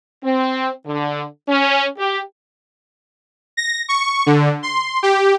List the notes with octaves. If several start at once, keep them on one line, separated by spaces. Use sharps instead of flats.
C4
D3
C#4
G4
A#6
C#6
D3
C6
G4